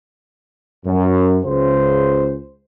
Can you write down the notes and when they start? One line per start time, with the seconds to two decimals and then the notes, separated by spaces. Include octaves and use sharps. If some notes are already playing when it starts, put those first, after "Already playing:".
0.86 F#2
1.45 C#2 C#3 C5